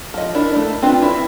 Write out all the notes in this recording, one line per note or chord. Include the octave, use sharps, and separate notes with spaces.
F3 D#5
D4 E4 A#4
A3 D4
C4 D4 F4 B4
E4